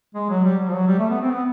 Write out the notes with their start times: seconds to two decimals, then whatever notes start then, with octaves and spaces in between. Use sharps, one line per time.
0.15 G#3
0.30 F#3
0.45 G3
0.59 F#3
0.68 F3
0.73 F#3
0.88 G3
0.99 A3
1.10 B3
1.21 C4
1.32 B3